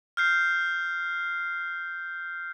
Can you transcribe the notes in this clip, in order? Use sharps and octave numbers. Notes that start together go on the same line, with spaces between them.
F6 G6 C7